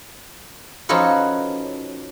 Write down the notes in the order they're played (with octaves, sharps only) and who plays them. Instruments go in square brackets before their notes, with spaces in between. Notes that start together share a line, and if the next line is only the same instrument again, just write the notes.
[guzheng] F3 C#4 D#4 F#4 A4 B4